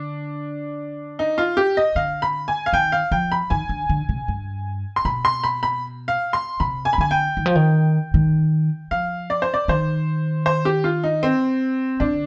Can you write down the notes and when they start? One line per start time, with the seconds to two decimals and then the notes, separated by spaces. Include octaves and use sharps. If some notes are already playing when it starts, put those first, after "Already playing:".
Already playing: D3 D4
1.19 D#4
1.38 F4
1.57 G4
1.77 D#5
1.95 D3 F5
2.22 B5
2.48 G#5
2.66 F5
2.73 D#3 G5
2.92 F5
3.11 F3 G5
3.32 B5
3.50 D#3 G#5
3.69 D3
3.89 D3
4.09 C3
4.28 G2
4.96 C6
5.05 B2 B5
5.25 C6
5.44 B5
5.63 B5
6.08 F5
6.33 C6
6.60 C3 B5
6.85 G#5
6.93 B5
6.98 D3 G#5
7.11 G5
7.37 D#3
7.46 F3
7.55 D#3
8.14 D#3
8.91 F3 F5
9.30 D5
9.42 C5
9.54 D5
9.68 D#3 C5
10.46 C5
10.65 G4
10.84 F4
11.04 D#4
11.23 C4
12.00 D3 D4